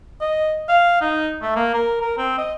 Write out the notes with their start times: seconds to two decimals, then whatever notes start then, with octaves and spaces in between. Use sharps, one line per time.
0.21 D#5
0.68 F5
1.01 D#4
1.42 A3
1.56 A#3
1.74 A#4
2.02 A#4
2.17 C4
2.38 D#5